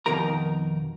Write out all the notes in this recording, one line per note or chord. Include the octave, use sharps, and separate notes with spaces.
F2 B2 D#3 D#4 A#4 A#5